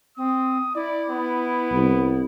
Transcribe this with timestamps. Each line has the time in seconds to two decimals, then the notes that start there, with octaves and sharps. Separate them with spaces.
0.17 C4 D#6
0.75 E4 D5
1.10 B3
1.72 C2